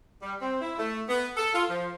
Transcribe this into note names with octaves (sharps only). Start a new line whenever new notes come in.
G3
C4
E4
A3
B3
A4
F4
F3